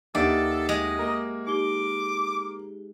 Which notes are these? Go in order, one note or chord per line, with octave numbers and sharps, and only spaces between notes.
D#2 D#4 G4 A4 D5 E5 F#5
G#3 D#5
A#3 A#4
D#4 G4 D6 G7